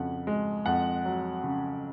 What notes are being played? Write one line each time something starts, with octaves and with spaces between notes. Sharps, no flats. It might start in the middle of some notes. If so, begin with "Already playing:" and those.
Already playing: F2 C#3 F#5
G#3
F2 F#5
F#3
C#3